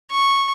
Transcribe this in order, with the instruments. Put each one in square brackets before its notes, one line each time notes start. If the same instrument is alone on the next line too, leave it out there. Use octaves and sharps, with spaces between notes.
[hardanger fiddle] C#6